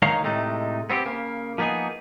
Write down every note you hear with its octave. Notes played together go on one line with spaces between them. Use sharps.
D#3 G#3 D#4 C#5 F5 A#5
A2 C3 G#3 A3 D#4
B3 C4 F#4 G4
C#3 A#3
F3 A#3 B3 D#4 G#4